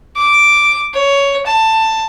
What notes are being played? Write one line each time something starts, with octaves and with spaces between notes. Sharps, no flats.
D6
C#5
A5